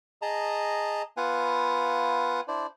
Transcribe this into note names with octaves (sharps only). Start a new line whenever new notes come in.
G#4 D#5 A5 A#5
B3 F4 B4 F5 F#5 G#5
D4 E4 C5 D5